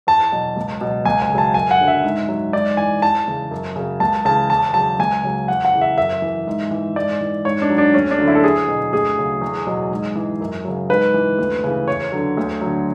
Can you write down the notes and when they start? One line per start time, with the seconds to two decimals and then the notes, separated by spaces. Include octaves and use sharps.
0.07 E2 A5
0.32 B2 F#3
0.57 C#2
0.81 B2 F#3
1.05 C#2 G#5
1.22 G#5
1.30 C#3
1.35 F#3 A5
1.54 F#2 G#5
1.71 F#5
1.80 D3 F#3
1.88 E5
2.04 G#2
2.29 F#3
2.53 G#2 D5
2.77 E3 G#5
3.02 E2 A5
3.28 C#3 E3
3.51 F#2
3.76 C#3 F#3
4.00 C#2 A5
4.25 C#3 E3 A5
4.50 E2 A5
4.74 C#3 F#3 A5
4.99 C#2 G#5
5.23 C#3 F#3
5.48 E2 F#5
5.65 F#5
5.74 C#3 E3
5.81 E5
5.98 F#2 E5
6.22 E3
6.47 G#2
6.71 E3
6.96 G#2 D5
7.21 E3
7.45 G#2 C#5
7.62 D4
7.70 F#3
7.78 D4
7.94 D2 C#4
8.11 D4
8.19 D3 F#3
8.28 E4
8.35 A4
8.43 E2 G#4
8.68 B2 F#3
8.92 D2 G#4
9.18 C#3 F#3
9.41 E2
9.67 B2 F#3
9.91 G#2
10.16 E3
10.41 F#2
10.65 C#3 F#3
10.89 G#2 B4
11.14 E3
11.38 D2
11.64 C#3 E3
11.88 E2 C#5
12.12 D3 F#3
12.37 D2
12.61 D3 F#3